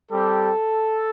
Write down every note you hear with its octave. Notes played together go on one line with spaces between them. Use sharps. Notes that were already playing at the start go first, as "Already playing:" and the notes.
G3 C4 G4 A4